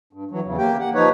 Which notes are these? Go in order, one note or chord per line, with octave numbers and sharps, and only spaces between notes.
G2
E3 F#3
E2 C#3
A#3 G4 G5
F#5
F3 D#4 B4 C#5